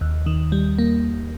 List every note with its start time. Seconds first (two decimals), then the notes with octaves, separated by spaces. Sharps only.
0.01 D#2
0.26 D#3
0.52 G3
0.78 A#3